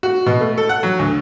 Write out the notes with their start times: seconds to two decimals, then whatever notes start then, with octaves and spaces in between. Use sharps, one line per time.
0.03 F#4
0.26 B2
0.41 A3
0.58 A4
0.69 F#5
0.83 F#3
0.99 D2